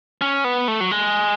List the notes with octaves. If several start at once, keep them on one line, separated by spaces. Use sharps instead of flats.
C#4
B3
A3
F#3
G#3